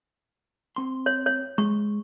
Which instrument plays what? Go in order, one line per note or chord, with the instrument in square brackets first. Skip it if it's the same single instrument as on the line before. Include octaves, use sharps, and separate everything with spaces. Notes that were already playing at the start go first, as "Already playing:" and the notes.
[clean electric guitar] C4 C6
[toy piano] C#5
C#5
[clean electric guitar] G#3 [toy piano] C#6